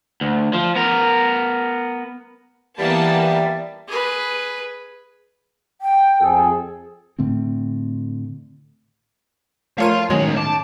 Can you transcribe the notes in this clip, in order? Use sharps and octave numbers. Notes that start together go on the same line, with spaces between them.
D2
F3
B3 A#4
E3 G3 A#3 B3 E4 D5 E5 A5
G#4 B4
G5
F2 G#4 A4
A2 D3 A3 C4
F3 A3 A#4 C#5 F5 C6 D#7
B1 A2 D#3 F#3 G#3 C#4 C#5 F#7
A5 D6